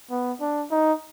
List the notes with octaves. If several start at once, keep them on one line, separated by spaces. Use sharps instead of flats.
B3
D4
D#4